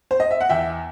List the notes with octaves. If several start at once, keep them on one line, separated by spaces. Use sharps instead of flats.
C5
D#5
E5
F#5
E2 E5 G5